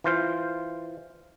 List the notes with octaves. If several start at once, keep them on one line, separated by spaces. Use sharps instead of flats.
E3 F4 C5 F5